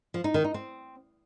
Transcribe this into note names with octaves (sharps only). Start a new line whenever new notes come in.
F3
D#4
D#3
D#4
C4